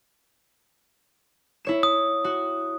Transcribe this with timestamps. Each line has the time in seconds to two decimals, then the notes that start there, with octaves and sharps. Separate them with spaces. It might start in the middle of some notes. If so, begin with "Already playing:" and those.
1.65 E4 C#5 E7
1.83 D#6
2.24 F#4